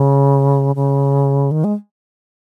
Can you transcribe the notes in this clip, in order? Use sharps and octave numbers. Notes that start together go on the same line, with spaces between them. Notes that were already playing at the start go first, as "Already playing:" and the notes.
Already playing: C#3
C#3
D#3
G#3